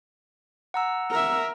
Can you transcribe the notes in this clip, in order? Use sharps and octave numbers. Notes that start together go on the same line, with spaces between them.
F#5 A#5 E6
A#4 E5